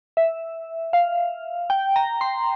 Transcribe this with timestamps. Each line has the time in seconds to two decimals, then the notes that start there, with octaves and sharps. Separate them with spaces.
0.17 E5
0.93 F5
1.70 G5
1.96 A#5
2.21 C6